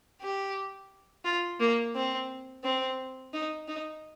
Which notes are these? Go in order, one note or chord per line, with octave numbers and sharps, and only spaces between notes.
G4
F4
A#3
C4
C4
D#4
D#4